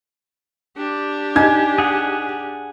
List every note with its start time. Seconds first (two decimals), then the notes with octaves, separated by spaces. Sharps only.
0.77 D4 G4
1.35 D#4 G#5 G#6
1.78 G#4 F#5